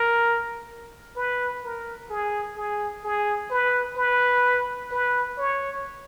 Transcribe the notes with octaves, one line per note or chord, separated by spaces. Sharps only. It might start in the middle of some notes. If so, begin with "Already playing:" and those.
Already playing: A#4
B4
A#4
G#4
G#4
G#4
B4
B4
B4
C#5